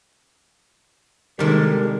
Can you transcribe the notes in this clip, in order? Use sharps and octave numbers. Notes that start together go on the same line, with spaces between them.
C3 D#3 G3 G#3 A4 A#4